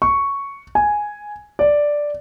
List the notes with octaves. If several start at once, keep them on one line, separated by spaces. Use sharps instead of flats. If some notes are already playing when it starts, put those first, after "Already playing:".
C#6
G#5
D5